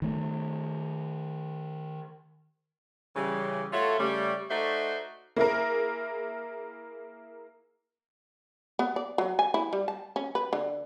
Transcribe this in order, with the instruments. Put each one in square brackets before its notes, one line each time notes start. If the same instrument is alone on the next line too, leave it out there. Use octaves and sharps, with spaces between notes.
[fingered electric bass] D#3 A3
[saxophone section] C#3 E3 G3
A3 F4 F#4 A4 C#5 E5
C#3 G3 A3
A3 D#4 F#4 C5 D5 E5
[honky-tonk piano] A#3 E4 G#4 A#4
[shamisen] B3
D5
F#3
G#5
E4
G3
A5
C#4
B4
D3